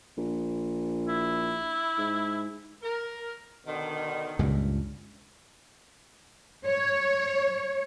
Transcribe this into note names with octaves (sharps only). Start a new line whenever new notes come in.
A#1
E4
G#2
A#4
B2 D3 D#3
C#2 G2 A#2
C#5